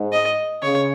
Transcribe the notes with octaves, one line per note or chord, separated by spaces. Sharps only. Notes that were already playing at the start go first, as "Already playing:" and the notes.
Already playing: G#2
D#5
C#3 C#5